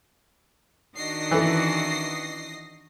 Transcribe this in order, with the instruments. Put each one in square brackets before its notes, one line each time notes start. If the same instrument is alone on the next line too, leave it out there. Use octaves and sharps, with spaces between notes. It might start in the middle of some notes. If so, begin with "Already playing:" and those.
[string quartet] D#3 D4 F#4 [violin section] D#5 A#6 C7
[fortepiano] E3 [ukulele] C#4 A4